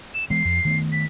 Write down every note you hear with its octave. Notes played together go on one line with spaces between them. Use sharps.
E7
E3 G#3 B3 C7
F2
D#3 A3 B3
B6